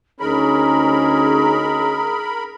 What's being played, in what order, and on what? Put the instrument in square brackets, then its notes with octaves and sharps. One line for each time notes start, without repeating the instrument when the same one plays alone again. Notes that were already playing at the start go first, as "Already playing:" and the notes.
[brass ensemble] D2 C#4 D#4 [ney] G#4 [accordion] A#4 B5 [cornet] A#5